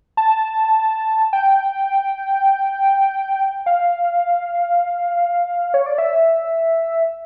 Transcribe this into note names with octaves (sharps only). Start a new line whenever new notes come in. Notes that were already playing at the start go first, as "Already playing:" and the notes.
A5
G5
F5
C#5
D5
E5